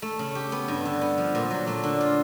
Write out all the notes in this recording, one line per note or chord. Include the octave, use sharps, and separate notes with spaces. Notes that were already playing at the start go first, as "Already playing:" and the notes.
A3
C#3
G4
B3
G2
D3
B3
F3
A#2
F#3
A3
D3
F4